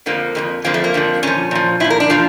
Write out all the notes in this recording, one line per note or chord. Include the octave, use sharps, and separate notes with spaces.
F2 D3 F3 A#3
F2 D3 F3
F2 D3 F3 A#3
A3
A#3
F2 D3 F3
A#2 F3 C#4
A#2 F3
A#2 F3 E4
A#4
D4
A#2 F3 F4